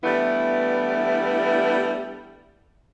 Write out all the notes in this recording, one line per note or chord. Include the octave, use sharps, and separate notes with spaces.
E3 G3 A3 B3 D4 E4